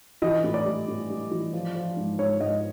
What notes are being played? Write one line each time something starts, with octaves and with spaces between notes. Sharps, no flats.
E3 D#5
A2
D5
G3
A2
G3
E3
F3
F3
G#2
G#2 C#5
G#2 D#5